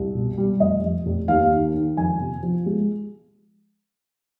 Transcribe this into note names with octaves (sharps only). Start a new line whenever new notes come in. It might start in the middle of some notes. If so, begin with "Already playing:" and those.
Already playing: C2
B2
G3
F1 D#5
F2
F1
D#2 F5
D#3
D#3
F2 G#5
C3
F3
G#3